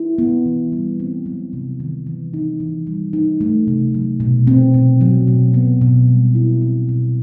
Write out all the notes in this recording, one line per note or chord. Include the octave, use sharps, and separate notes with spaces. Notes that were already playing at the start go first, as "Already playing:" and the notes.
Already playing: E4
B3
E3
G3
C4
F#3
C3
D#3
E3
D#4
E3
G3
D#4
A3
C3
F#3
B2
C4
B2
F#3
B2
B3
B2
G3
E4
C4
B2